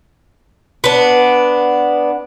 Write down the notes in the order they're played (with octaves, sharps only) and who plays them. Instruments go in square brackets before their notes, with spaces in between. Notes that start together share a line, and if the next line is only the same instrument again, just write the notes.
[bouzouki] B3 D4